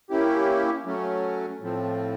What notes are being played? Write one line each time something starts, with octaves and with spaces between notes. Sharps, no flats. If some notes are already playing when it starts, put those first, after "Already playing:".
A#3 C#4 E4 G4
F#3 A3 C#4
A2 F3 A3 C4